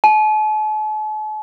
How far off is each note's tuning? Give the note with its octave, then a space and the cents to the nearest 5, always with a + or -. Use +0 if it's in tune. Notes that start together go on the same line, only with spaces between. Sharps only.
A5 -45